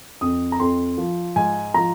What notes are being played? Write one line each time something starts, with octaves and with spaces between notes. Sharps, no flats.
F2 D#6
A#5
F2 C6
F3
G#2 G#5
F3 A#5